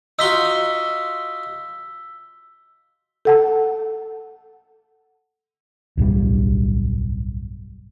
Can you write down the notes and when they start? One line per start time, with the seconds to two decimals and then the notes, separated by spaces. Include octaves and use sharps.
0.19 D#4 F4 F#4 E6 B6 G7
3.25 A4 F#5 A5
5.97 D1 B1 G2 G3